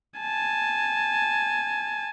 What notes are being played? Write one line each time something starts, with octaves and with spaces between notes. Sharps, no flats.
G#5 A5